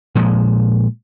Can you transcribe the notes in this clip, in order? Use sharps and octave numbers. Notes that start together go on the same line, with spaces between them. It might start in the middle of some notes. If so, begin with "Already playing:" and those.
A#2 F3 G#3